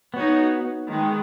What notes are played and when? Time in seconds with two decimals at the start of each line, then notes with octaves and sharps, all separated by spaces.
0.14 B3 D#4 F#4 C#5
0.90 D#3 G#3 B3